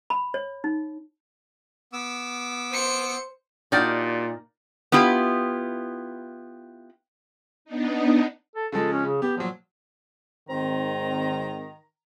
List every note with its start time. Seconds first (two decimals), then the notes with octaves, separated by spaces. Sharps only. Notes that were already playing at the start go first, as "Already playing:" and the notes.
0.10 B5
0.34 C#5
0.64 D#4
1.93 B3 D6 E6
2.72 C5 C#7
3.72 A#2 D4 D#4 F#4 G4 D5 F6 G6
4.92 B3 E4 F4 G4
7.65 B3 D4 D#4
8.56 A4
8.72 C#3 F3 G#3 A4
8.93 C#4
9.05 C#3
9.22 B3 G4
9.38 A#2 F3 F#3
10.49 G#1 D#3 C4 A#5